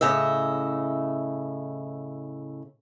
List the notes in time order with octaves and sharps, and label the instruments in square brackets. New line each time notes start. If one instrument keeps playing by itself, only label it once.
[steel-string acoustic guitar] A2 C#3 D#5 E5